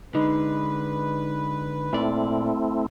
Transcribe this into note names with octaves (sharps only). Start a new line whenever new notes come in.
D3 G#3 D#4 B4
A#2 A3 C4 E4 D5